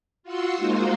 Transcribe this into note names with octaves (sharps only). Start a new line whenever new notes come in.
F4 F#4 F#5 C6 E6
G#3 A#3 D#4 F4 F#4 C5